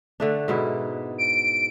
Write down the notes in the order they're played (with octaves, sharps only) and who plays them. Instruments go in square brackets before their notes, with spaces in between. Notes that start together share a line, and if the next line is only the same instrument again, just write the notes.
[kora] D3 A3 D4
G#2 B2 E4
[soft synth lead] D7